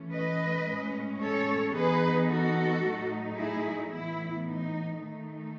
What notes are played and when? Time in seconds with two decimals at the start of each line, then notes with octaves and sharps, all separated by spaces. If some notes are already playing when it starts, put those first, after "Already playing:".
Already playing: E3 A3 C#4
0.13 B4 D#5
0.67 A2 G#3 C#4
1.21 A4 C#5
1.74 E3 B3 D#4 G#4 B4
2.29 F#4 A4
2.83 A2 F#3 A3 D#4
3.36 E4 G#4
3.90 A2 E3 B3 E4
4.44 D#4
4.97 D#3 A3 D#4